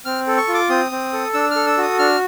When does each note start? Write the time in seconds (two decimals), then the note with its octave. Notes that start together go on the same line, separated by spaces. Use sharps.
0.05 C4 F6
0.27 A4
0.38 C#6
0.48 F4
0.54 D6
0.69 C4 D#6
0.91 C4
1.13 A4
1.34 D4 E6
1.51 A4 F6
1.67 E6
1.78 F#4 D#6
1.99 D4 F6